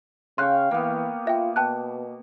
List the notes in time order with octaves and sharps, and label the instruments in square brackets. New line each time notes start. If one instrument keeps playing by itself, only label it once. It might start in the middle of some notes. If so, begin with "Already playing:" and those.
[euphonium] C#3 [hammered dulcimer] F5 G5 C#6 [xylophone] C6 F#6
[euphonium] E3 [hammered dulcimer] A#3 B3
[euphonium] F4 [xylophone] E5 G5
[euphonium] B2 [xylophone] G5 A5 F#6